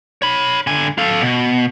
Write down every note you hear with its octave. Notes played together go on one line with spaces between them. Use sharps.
C#5 B5
D3 G#5
A4 F5
B2